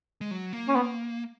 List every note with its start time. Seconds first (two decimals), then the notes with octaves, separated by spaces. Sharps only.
0.21 G#3
0.31 F#3
0.53 A#3
0.68 C#4
0.76 B3